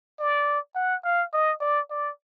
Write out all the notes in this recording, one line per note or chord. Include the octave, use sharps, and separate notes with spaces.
D5
F#5
F5
D#5
D5
D5